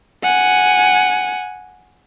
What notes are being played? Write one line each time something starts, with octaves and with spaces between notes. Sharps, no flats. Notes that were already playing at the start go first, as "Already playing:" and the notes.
F#5 G#5